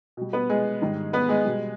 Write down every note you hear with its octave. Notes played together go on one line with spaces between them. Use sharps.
B2 G3
B3 B4
G#3 G#4
G#2 D#3 G3
B3 B4
G#3 G#4
B2 G3